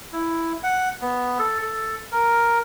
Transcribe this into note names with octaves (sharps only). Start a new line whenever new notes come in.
E4
F#5
B3
A4
A4
A#4